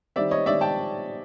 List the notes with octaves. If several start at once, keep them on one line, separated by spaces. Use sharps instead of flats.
D#3 G3 C4 D5 E5
C#5 D#5
D#3 G3 C4 D5 E5
G5 A5